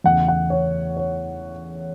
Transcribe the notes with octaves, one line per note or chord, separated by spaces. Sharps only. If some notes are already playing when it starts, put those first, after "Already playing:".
E2 C#3 A3 F#5
F#5
C#5
C#5